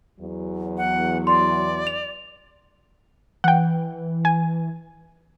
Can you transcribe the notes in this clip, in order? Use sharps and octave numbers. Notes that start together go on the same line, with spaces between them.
E2 F#3
F#5
D5 C6
F7
E3 F#5 G5
G#5